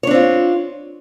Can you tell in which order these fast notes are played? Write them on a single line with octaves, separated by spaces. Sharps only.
C#5 D4 C4 F4